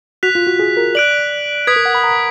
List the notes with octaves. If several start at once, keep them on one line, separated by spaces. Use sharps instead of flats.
F#4 F#6 B6 F7
F4
F#4
G#4
A#4
D5 F#6 D7 F#7
B4 D#6 G#6 B6
A#4
F#5
B5
A#5